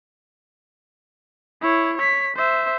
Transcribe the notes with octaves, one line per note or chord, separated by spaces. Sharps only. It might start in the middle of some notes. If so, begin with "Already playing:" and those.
E4 C#5
C#5 B6
C5 E5